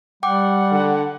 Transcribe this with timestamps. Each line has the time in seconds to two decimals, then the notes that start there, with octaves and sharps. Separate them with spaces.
0.23 G3 F#5 G5 D6
0.72 D3